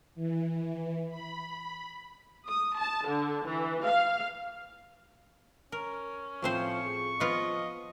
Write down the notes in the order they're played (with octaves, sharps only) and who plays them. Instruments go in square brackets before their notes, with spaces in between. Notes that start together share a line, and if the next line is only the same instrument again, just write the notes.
[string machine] E3
B5
[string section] D#6
A5
D3
E3
F5
[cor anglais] C#4 [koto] A#4
[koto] A2 C4 C5 [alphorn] F3 [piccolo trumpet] C#6
[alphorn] G#4
[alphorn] F3 [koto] B3 F4 [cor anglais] D#5